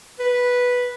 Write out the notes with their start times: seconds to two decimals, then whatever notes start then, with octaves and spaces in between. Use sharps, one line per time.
0.19 B4